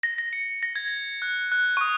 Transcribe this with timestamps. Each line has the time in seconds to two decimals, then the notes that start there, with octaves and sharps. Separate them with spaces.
0.03 A#6
0.18 A#6
0.33 C#7
0.63 A#6
0.76 G#6
0.88 A#6
1.22 F#6
1.52 F#6
1.77 C#6
1.81 D#6